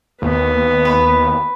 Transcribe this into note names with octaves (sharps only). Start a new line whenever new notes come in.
D#2 B3
B4 B5